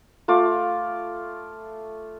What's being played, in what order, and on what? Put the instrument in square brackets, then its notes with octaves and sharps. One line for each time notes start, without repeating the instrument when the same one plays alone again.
[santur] A3 F4 D6